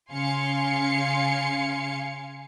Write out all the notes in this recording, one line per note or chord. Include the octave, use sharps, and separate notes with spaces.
C#3 F5 G#5 C6 C#7